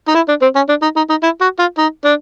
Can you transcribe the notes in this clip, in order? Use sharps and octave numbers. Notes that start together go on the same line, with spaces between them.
D#4
E4
D4
C4
C#4
D4
D#4
D#4
D#4
E4
F#4
F4
D#4
D4